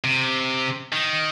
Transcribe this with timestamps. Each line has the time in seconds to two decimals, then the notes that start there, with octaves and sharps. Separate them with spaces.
0.04 C3
0.93 D#3